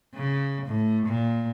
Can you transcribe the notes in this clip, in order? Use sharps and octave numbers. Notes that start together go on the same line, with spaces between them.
C#3
A2
A#2